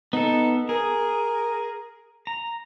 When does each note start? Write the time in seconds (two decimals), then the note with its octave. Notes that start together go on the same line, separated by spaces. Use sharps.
0.13 B3 D#4 A4
0.69 G#4 A#4
2.27 A#5